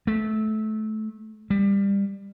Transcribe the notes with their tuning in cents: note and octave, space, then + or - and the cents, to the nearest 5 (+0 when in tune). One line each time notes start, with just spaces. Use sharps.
A3 -20
G3 +25